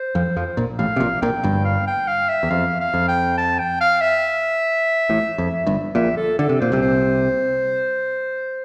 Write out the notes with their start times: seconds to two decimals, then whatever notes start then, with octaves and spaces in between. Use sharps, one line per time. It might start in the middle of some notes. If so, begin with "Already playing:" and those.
Already playing: C5
0.15 F2 F3
0.36 F2 F3
0.57 A#1 A#2
0.79 A1 A2 F5
0.96 C3
1.00 A#1 A#2
1.22 A#1 A#2 G5
1.43 G1 G2
1.65 F5
1.87 G5
2.08 F5
2.29 E5
2.43 E2
2.51 F2 F5
2.81 F5
2.94 F2
3.08 G5
3.38 A5
3.59 G5
3.81 F5
4.01 E5
5.09 A1 A2
5.38 F2
5.66 G1 G2
5.95 A#1 A#2 E5
6.16 A4
6.39 D3 A4
6.49 C3
6.60 A#2 C5
6.72 C2 C3
6.81 C5